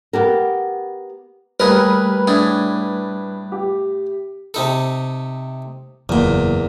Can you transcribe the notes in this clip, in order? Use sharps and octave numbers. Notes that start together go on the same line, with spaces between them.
B3 G4 A#4
D#2 G3 A3 G#4 A#4 B4
A2 D4 G#4
G4
C3 D#4 A4
F#1 E2 A#2